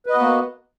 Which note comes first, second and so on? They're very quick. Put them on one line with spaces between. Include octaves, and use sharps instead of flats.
B4 D#5 F#4 B3 A#3